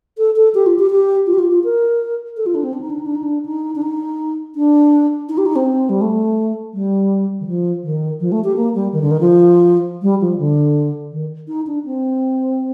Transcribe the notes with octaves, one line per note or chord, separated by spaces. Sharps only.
A4
A4
G4
F4
G4
G4
F4
G4
F4
F4
A#4
A4
F4
D4
C4
D4
D#4
D4
D#4
D4
D#4
D4
D#4
D4
D#4
D4
D#4
G4
D#4
C4
G3
A3
G3
D#3
F3
D#3
F3
A3
G4
A#3
G3
D#3
D3
D#3
F3
G3
F3
D3
D#3
D#4
D4
C4